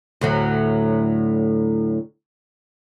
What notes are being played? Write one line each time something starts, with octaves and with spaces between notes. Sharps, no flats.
D2 A2 F#3